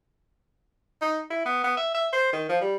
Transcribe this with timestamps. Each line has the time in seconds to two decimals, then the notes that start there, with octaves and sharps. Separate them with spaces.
1.01 D#4
1.30 E4
1.45 B3
1.64 B3
1.77 E5
1.94 E5
2.13 C5
2.33 D#3
2.49 F3
2.61 G3